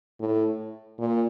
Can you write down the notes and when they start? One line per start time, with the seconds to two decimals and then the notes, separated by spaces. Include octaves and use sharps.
0.20 A2
0.99 A#2